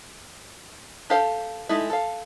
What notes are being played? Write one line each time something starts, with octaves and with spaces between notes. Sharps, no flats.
D4 G4 A4 C5 F5
G#3 A3 D#4 E4
A4 F5